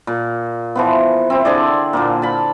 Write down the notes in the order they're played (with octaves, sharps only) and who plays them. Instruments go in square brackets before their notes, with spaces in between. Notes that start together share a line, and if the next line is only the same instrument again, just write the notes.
[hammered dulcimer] A#2
E3 F3 B3
C4 E4
D3 G#4 D5
A#2 D3 A#3
A5 B5